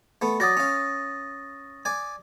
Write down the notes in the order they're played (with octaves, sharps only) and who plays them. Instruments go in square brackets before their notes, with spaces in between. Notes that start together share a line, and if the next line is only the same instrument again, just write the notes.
[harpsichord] A3 B3
[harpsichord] F#3 D5 F#5 [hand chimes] D#6 A6 A#6
[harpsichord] C#4 F5
D5 G#5